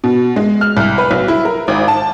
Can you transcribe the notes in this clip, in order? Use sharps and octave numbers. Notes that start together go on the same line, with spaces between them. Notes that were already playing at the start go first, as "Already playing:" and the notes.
B2
G#3
F6
C2
B4
B1
E4
A#4
G#1
A5